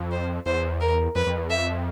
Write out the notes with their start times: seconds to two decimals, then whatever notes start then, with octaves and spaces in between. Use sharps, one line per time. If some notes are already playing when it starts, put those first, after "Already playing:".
Already playing: F2
0.12 C5
0.46 E2 C5
0.81 A#4
1.15 F2 B4
1.27 F2
1.38 E2
1.50 F2 E5